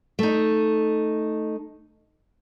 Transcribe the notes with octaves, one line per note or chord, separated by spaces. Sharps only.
A3 D#4